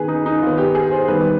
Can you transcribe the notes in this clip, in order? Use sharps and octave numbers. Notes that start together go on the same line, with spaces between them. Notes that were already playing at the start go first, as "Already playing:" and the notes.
Already playing: D#3 B3 G#4 B4
D#4
D#4
D#3 B3 F4
G4
G#4
C5
D#3 G3 B3 B4